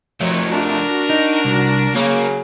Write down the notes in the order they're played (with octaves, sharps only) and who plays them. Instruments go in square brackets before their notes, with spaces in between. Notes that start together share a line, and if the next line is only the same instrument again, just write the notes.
[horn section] D#3 F#3 C#5 [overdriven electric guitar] F3 A3
[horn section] D4 F#4 A#4
[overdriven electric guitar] D#4
C2
[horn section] C#3 F#3 [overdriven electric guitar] A#3